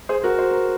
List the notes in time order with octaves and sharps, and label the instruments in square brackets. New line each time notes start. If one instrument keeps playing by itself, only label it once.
[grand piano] G#4 C5
F#4 A#4
C5
A#4